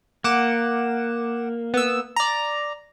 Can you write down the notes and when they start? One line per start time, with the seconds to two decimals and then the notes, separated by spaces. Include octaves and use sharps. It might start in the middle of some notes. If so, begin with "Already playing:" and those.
0.24 A#3 F#5 D6 E7
1.74 B3 E6
2.16 D5 A#5